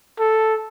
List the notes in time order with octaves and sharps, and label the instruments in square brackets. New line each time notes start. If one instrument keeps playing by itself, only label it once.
[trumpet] A4